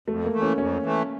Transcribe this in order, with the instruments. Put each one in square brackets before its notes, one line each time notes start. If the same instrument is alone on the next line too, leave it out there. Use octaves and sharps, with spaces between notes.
[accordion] F2 [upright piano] A3
[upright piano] A#3
[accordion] E3 A3
[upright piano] C#4
[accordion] F2 [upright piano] C#4
[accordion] E3 A3